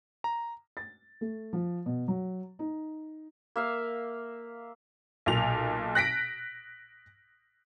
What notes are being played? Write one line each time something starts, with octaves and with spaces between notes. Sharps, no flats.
A#5
A6
A3
F3
B2
F#3
D#4
A#3 E5 F5
B1 A#2 F7
F#6 A#6 B6 D7